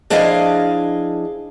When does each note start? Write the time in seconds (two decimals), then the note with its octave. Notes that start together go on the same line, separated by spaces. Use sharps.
0.10 F3 D4 E4 G#4 D#5 F5